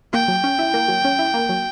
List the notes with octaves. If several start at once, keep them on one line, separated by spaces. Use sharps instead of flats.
A#3 G5
F#3
C#4
E4
A#3
F#3
C#4
E4
A#3
F#3